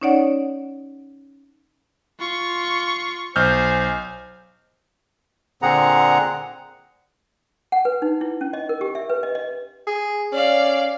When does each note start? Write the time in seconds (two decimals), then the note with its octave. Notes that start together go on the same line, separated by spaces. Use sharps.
0.01 C#4 D#4 C#5 D5 F#5
2.20 F4 C#6
3.36 B1 C5 G#5 F6 G6
5.62 A#2 D3 C4 G#4 F#5 A#5
7.72 F#5
7.85 B4
8.02 D#4
8.21 E4
8.41 C#4
8.53 D#5
8.69 A#4
8.81 G4
8.95 E5
9.10 B4
9.23 D#5
9.35 D#5
9.87 G#4
10.33 C#4 D5 F5